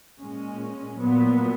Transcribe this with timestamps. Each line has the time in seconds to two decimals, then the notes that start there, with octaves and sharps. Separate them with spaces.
0.20 A#2 G#3 C#4
0.99 A#2 F#3 B3